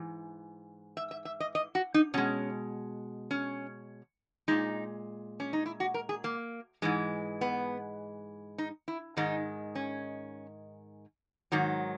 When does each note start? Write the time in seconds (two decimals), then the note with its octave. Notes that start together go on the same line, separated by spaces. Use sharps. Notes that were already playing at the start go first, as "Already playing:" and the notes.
Already playing: G#2 E3
0.97 E5
1.11 E5
1.25 E5
1.40 D#5
1.55 D#5
1.75 F#4
1.94 D#4
2.14 B2 G#3 C#4
3.31 C#4
4.48 A#2 G#3 D#4
5.40 C#4
5.53 D#4
5.66 E4
5.80 F#4
5.94 A#4
6.09 G#4
6.24 A#3
6.82 G#2 E3 G#3
7.41 B3
8.58 D#4
8.88 E4
9.17 G#2 D#3 G#3 D#4
9.75 C#4
11.52 G#2 D#3 F#3